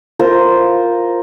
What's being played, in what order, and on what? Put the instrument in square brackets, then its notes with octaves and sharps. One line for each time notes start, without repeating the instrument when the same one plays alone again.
[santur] F4 A#4 C5